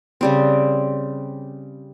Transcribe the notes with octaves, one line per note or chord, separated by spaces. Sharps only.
C#3 G3 C4